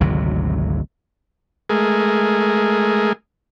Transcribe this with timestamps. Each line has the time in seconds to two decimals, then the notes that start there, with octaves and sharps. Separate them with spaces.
0.01 G#1 D2 C3 F#3
1.70 G#3 A3 G#4 A#4